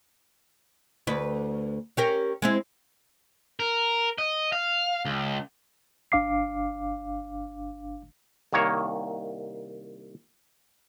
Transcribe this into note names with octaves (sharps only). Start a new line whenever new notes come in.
D2 B4
C#4 G4 A#4
G#3 C4 E4
A#4
D#5
F5
C#2
G1 D4 F5 D6 C7
C2 D#3 A#3 C#5